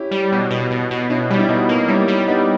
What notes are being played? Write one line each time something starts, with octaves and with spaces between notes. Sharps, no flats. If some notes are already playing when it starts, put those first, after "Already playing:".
Already playing: C#4 E4 G4
G3
B2
B2
B2
B2
B2 C#4 E4
G3
E4
B2 B3 D#4
A#3
G3 C#4 E4
G3
G3 B3 D#4